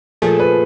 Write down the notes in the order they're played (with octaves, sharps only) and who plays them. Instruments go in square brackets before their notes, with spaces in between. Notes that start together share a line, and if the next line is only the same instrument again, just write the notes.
[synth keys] A#2 F3 A3 [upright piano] G#4
[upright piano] B4